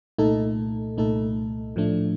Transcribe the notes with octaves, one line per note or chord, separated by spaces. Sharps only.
C2 A#2 A3 D#4 A4
C2 A#2 A3 D#4 A4
A2 F3 A3 D4